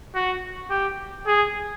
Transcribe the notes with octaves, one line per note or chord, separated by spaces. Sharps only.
F#4
G4
G#4